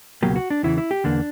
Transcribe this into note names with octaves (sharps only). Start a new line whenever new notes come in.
C#2 B2 F#3 A#3 G4
F#4
D4
E2 C#3 E3 E4
E4
G4
E2 D3 A#3 D4